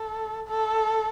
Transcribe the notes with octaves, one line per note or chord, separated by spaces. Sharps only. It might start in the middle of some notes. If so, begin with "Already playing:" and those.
Already playing: A4
A4